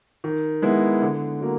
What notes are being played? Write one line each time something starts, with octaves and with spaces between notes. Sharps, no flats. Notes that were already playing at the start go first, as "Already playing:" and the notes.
D#3
G#3 B3 E4
D3
F#3 A#3